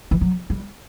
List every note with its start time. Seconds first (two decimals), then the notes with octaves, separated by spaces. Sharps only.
0.11 E3
0.21 F#3
0.50 G3